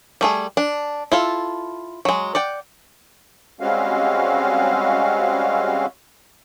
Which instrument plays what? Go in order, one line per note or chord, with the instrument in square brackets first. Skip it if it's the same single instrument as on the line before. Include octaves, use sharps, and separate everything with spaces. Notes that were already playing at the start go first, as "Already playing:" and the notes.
[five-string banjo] G3 A3 G#4
D4
E4 F4 A4
F#3 G#3
D5 F#5 G5
[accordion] G3 G#3 C4 C#4 F#4 F5